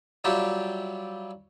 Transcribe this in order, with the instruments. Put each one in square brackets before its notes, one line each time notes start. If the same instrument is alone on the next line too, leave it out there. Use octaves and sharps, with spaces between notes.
[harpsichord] F#3 G3 F4 G4 E5